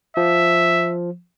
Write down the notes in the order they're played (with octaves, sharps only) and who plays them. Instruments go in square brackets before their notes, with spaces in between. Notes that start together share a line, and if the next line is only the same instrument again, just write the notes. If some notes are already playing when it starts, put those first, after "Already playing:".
[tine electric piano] F3 [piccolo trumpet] E5